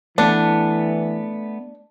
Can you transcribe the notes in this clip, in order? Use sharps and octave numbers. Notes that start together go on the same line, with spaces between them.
E3 A3 B3 D4